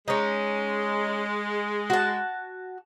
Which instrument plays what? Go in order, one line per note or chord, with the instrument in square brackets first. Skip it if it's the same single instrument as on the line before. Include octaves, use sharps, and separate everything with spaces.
[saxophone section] G#3 [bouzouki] C#4 D#4
[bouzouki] F#4 A5